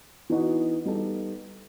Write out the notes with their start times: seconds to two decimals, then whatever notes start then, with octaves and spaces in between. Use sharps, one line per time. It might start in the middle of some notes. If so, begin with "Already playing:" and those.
0.30 E3 B3 D#4 F#4
0.85 G3 B3 D#4 A4